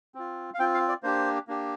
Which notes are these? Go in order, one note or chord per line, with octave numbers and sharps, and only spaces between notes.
C4 F4
F5
C4 F4 G5
F5
D5
A#3 D4 G4 C5
A#3 D4 G4